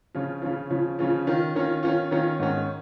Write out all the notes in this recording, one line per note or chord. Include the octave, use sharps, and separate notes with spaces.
C#3 F3 C#4 F4
C#3 F3 C#4 F4
C#3 F3 C#4 F4
C#3 F3 C#4 F4
D#3 C#4 F4
D#3 C#4 F4
D#3 C#4 F4
D#3 C#4 F4
G#2 D#3 C#4